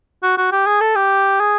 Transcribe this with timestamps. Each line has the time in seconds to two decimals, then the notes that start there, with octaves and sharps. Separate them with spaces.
0.23 F#4
0.37 F#4
0.52 G4
0.66 G#4
0.81 A4
0.95 G4
1.40 G#4